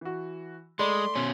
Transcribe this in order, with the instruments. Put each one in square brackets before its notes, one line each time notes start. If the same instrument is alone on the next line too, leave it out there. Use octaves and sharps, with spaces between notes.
[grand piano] E3 F#4
[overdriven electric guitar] G#3 [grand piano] A3 D5 B5 [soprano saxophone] C6
[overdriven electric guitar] B2 C#4